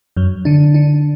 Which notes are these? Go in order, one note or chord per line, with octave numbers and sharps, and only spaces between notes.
F#2 F#3
D3 D4
D3 D4